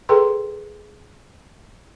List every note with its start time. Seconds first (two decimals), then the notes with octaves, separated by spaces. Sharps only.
0.09 G#4 A4 B4 G5 A#5 C6